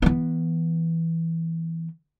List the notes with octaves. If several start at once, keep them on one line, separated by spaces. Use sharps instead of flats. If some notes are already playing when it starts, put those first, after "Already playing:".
E3 B3